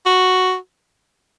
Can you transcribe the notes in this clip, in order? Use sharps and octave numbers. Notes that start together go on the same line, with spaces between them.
F#4